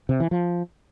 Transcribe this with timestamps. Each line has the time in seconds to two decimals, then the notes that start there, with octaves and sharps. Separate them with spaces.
0.09 C3
0.20 E3
0.31 F3